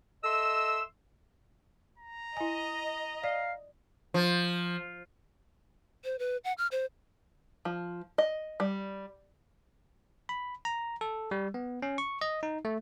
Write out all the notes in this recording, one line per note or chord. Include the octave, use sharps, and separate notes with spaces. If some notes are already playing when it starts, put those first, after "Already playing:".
A4 D#5 E5 C6 E6
A#5
E4 D#5 G#5
D5 F5
F3
C5
B4
F#5
F6
C5
F3
D#5
G3
B5
A#5
A4
G3
B3
C#4
C#6
D#5
D#4
A3